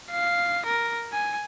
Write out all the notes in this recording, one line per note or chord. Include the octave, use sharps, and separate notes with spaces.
F5
A#4
G#5